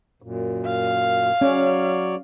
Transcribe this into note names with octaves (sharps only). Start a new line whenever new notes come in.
F#2 A#2
F5
F#3 C#4 C#5 D5